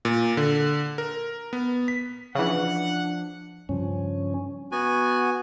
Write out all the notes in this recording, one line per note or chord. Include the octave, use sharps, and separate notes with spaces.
A#2
D3
A#4
B3
B6
C#3 E3 F3 D4 F#5
G2 C#3 F3 C#4
B3 F#4 G#5